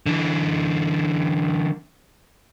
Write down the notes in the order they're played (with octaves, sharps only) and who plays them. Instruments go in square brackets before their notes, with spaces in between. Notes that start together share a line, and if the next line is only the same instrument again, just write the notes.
[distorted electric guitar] D3 E3